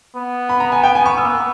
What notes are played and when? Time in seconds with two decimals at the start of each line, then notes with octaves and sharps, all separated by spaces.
0.15 B3
0.49 B5
0.60 A#5
0.72 G#5
0.83 G5
0.95 G#5
1.06 C#6
1.17 E6
1.24 A#3
1.29 B3